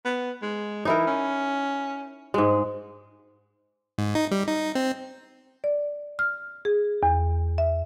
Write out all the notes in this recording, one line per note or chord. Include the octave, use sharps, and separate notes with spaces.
B3
G#3
E3 D#4 E4 A#4
C#4
G#2 G#3
G#2
D#4
G3
D#4
C4
D5
F6
G#4
E2
E5